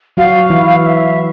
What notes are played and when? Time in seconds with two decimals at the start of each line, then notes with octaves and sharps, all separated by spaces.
0.17 F#3 F#4 F5
0.50 E3 E4
0.82 F5
0.87 E5